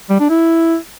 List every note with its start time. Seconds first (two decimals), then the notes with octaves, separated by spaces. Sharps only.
0.10 G3
0.20 D4
0.30 E4